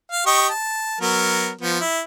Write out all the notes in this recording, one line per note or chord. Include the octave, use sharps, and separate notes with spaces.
F5
G4 D#5 C#6
A5
F#3 B3 A#4
F3 B3
E4